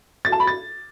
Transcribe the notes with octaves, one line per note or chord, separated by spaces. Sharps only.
A6
A5
B5
A6